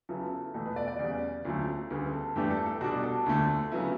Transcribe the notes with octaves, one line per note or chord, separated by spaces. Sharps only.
C#3 F#3 B3 E4 A4
E2 B2 A3 A4
B4
D5
D5
E2 C#3 G3
D2 C#3 F#3 A3
D2 C#3 G3 B3
A4
G2 E3 A3 D4 G4
A4
A4
B2 G3 D4 F#4
A4
D2 D3 A3
C#3 F#3 B3 E4